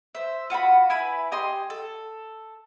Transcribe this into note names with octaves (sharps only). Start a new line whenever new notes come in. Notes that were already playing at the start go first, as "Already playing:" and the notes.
C5 E5
F4 F#4 A5 B5
E4 B4 G#5 B5
G4 D#5 G#5 C6
A4